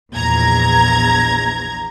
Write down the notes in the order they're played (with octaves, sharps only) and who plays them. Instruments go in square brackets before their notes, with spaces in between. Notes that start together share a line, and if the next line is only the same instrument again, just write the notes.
[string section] A#1 E2 A#5 G#6